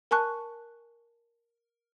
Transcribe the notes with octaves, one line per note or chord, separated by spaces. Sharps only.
A#4 G#5 A5 C#6 F#6